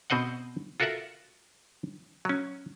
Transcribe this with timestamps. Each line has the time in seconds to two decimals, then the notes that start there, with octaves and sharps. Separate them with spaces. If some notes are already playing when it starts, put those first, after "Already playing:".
0.10 B2 C4 C5 D#5 F#5
0.80 F4 F#4 A4 A#4 E5 F#5
2.25 F#3 C#4